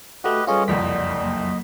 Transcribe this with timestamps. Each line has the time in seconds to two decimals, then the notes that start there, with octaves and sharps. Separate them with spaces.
0.24 A3 F#4 G4 B4 D#5 F#5
0.47 G3 C#4 F4 G#4 A4 B4 C#5 D#5
0.68 F#1 C2 F2 D5 D#5 F#5 B6
1.21 F#3 A#3